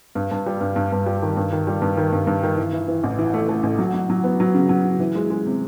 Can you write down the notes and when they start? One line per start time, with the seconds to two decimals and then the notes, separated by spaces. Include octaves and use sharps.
0.15 G2
0.31 G2
0.46 G3
0.61 G2
0.76 G2
0.92 G2
1.06 G3
1.22 D#3
1.37 G2
1.52 D#3
1.67 G3
1.82 G2
1.97 D#3
2.13 G2
2.27 G2
2.43 D#3
2.57 E3
2.73 E3
2.88 E3
3.04 A1
3.19 E3
3.34 A3
3.49 A3
3.63 A1
3.79 F#3
3.94 F#3
4.10 F#3
4.24 B3
4.40 F#3
4.54 C#3
4.69 F#3
4.85 C#3
5.00 E3
5.15 G#3
5.30 G#3
5.46 C3